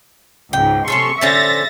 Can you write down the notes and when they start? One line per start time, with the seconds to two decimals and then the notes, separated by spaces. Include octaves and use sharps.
0.53 C#2 G#2 G5
0.88 C3 C#4 A4 C6 C#6
1.21 D3 C#4 C5 E5 A6 A#6